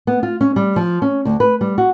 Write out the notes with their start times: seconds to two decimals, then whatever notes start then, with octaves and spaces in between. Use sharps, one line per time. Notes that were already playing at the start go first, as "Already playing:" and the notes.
0.07 B3
0.23 F4
0.41 C#4
0.56 G3
0.76 F3
1.02 C#4
1.25 D2
1.40 B4
1.61 G3
1.78 F#4